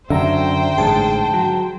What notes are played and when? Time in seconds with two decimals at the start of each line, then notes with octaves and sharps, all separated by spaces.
0.10 F#2 D3 C5 E5 G5 A#5
0.78 A1 G#2 G#4 A5
1.34 F#3